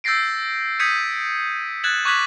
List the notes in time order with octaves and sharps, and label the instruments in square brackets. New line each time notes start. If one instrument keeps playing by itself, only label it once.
[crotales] E6 G6 A6 A#6 C7 D7
D#6 G6 G#6 B6 C#7 D#7
F#6 G#6 A6 E7 F#7
C#6 D6 F#6 G#6 B6 F#7